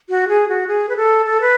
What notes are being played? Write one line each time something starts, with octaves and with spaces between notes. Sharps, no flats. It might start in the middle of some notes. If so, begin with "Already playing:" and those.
F#4
G#4
F#4
G#4
B4
A4
A4
B4